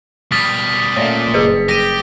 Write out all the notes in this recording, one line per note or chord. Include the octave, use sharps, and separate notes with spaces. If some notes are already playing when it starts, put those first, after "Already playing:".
B2 G3 D#6 F6 A6 B6
A#2 A3 C#4 C#5 D5
F#1 G2 G#4 B4 C#7
G4 A#6 D#7